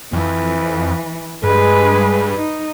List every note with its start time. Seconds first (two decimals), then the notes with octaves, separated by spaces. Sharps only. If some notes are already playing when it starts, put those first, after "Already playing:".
0.13 F2 E3
1.44 G2 G#3 G#4 B4
2.37 D#4